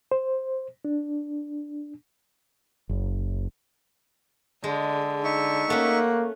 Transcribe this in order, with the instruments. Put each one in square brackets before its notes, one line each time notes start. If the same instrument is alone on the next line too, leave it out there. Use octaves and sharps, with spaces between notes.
[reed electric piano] C5
D4
[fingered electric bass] F#1
[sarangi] D3 [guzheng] G#3
[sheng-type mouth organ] D#4 E5 C#6
[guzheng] A3 C#4 [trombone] A#3 [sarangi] F#5